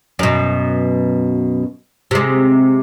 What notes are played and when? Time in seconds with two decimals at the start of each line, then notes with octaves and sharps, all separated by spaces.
0.19 F#2 B2
2.11 C3 G#3